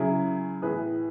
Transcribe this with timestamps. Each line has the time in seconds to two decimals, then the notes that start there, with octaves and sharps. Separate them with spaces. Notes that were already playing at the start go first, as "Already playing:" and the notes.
Already playing: C#3 F#3 E4 G#4
0.62 A2 E3 G#4 B4